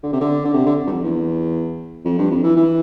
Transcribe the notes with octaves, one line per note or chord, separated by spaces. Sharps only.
D3
C3
D3
D3
C3
D3
G2
F2
E2
F2
G2
F2
E3
E3